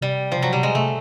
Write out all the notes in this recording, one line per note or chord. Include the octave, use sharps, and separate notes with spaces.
C3 G3
F3
C3 F#3
C3 G3
G#3
C3 A3